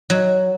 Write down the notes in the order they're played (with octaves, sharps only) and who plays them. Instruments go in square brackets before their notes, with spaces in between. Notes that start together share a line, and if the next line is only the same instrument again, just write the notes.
[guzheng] F#3